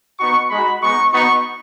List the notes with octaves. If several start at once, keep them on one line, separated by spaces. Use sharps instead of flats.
B3 D#4 F#4 C#6
G#3 D#4 F#4 B5
G#3 B3 D#4 C#6
B3 D#4 F#4 C#6